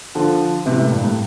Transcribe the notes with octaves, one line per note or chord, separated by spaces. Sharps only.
D3 F3
C3 E3
A2
G2
A2